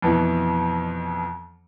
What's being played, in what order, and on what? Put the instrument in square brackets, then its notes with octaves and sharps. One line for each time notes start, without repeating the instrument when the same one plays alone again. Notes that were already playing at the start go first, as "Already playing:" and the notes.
[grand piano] F2 B2 E3